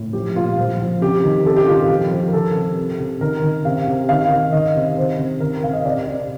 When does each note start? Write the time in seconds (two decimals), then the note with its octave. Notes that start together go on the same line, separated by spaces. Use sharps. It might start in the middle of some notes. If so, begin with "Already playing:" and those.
Already playing: A2
0.13 F3 G4
0.36 A#2 F4
0.58 F3
0.79 F3
1.01 C3 G4
1.23 D#3
1.46 C3 A4
1.56 G4
1.67 D#3 F4
1.79 G4
1.89 F3
2.11 F3
2.28 A#4
2.33 D#3 A4
2.55 C3
2.77 C3
3.00 C3
3.21 D#3 A#4
3.44 D#3
3.65 C3 F5
3.88 C3
4.09 D#3 F5
4.31 D#3
4.53 D#3 D#5
4.76 C3
4.97 D#3 C5
5.19 C3
5.40 D#3 A#4
5.63 C3 F5
5.73 D#5
5.85 C3 D5
6.07 C3